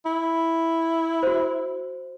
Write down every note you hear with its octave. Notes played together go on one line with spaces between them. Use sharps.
E4
F#4 C5